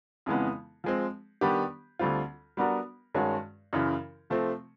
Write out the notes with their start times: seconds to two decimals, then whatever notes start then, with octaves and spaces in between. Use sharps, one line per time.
0.26 F2 C#3 E3 G#3 B3
0.84 F3 G#3 C4
1.41 D#3 G3 B3 D4 G4
1.99 D2 D3 G3 C4 F4
2.57 G3 B3 D4 F#4 A#4
3.14 G2 D#3 G#3 C#4 F#4
3.73 F#2 C#3 E3
4.30 C3 F3 A3 C4